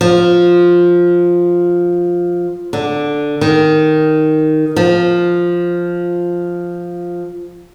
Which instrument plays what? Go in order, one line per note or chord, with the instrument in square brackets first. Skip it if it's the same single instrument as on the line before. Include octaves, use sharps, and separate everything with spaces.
[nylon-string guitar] F3
D3
D#3
F3